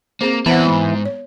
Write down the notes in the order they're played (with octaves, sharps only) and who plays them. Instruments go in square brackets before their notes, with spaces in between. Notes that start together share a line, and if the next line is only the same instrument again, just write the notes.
[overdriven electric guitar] A#3 [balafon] C4 G#4 C5
[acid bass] E3 [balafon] B3 C5 F#5 [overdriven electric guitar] C4 E4
[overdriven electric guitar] G#2 G#3
[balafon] C#5